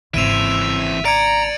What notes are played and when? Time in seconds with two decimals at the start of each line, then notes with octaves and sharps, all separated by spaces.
0.14 G#1 C#3 E3 C4 E5 D7 D#7 F7
1.05 D5 A#5 G#6 C#7 D7